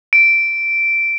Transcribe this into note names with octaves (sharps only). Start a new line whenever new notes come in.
D7